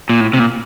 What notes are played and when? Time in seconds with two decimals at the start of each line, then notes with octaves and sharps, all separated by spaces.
0.09 A#2
0.21 A2
0.33 C3
0.39 A#2